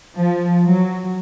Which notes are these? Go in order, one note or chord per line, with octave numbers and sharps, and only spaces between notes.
F3
F#3